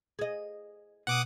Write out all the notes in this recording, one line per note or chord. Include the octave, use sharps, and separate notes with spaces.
G#4 D#5
B2 F#5 D6 D#6